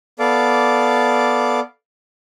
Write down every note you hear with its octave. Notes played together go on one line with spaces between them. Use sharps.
B3 A4 D5 F5 D6